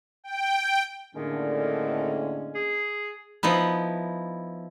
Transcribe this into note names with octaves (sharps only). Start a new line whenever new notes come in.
G5
A2 D3 D#3 G#3 A#3 C#4
G#4
F3 B3 D#4 E4